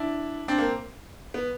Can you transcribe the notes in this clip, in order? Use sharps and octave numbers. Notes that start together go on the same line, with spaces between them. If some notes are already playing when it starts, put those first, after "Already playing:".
Already playing: D4 E4
C4 D4
A#3 C4
B3